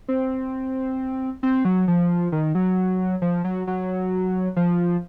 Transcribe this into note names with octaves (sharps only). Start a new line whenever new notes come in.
C4
C4
F#3
F3
D#3
F#3
F3
F#3
F#3
F3